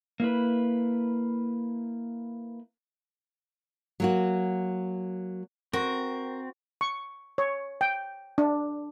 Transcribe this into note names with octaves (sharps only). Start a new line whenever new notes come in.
A#3 E4 B4
F#3 A#3 F#4
C4 F#4 A#4
C#6
C#5
G5
D4